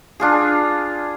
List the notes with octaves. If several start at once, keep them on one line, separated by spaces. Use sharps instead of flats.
D4 F4 G#4